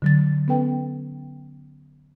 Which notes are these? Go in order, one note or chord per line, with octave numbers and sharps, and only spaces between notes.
D3 F#3 A6
B3 C#4 A4 B4 G5